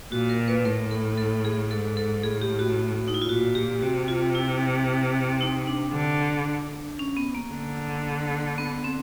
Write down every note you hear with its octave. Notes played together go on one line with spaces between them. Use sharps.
A#2 F#4
A#4
B4
A2 A#4
A4
A4
G#4
G#2 A4
A4
A2 G#4
G4
F#4
D#4
E4
F4
A#2 F#4
G4
C3 F#4
F4
E4
D#4
D4
D3
C#4
B3
A#3
D3
B3
C4